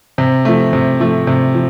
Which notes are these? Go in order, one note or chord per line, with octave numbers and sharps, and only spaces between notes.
C3
F3 A3
C3
F3 A3
C3
F3